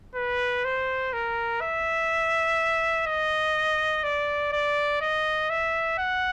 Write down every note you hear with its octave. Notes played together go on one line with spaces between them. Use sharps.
B4
C5
A#4
E5
D#5
D5
D5
D#5
E5
F#5